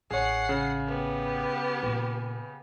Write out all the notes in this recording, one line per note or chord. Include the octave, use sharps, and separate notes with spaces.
A1 G#4 C#5 F#5 C7
C#3
B3 G4
A#2 A#3